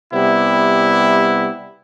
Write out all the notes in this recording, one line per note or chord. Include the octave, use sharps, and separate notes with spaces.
C3 G3 B3 E4